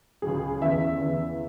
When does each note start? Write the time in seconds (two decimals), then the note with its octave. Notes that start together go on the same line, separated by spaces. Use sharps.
0.22 C#2 C#3 F#3 G#4
0.62 E2 C#3 E3 E5
1.01 E2 C#3 E3